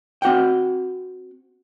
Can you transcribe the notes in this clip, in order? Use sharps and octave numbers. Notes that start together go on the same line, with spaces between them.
C4 F#4 F#5 G5